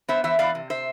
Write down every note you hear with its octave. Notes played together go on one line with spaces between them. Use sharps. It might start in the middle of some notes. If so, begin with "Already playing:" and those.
B3 C5 E5
E3 C5 E5
B3 D5 F5
C3
C5 E5